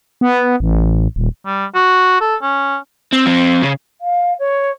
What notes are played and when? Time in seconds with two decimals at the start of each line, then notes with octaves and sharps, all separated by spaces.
0.21 B3
0.60 A1
1.16 D#1
1.46 G3
1.75 F#4
2.21 A4
2.42 C#4
3.12 C4
3.26 F3 C4
3.62 C#3
4.01 F5
4.39 C#5